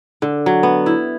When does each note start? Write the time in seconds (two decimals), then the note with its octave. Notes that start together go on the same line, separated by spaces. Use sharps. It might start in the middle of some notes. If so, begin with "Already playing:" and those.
0.22 D3
0.46 F#3
0.63 B3
0.86 E4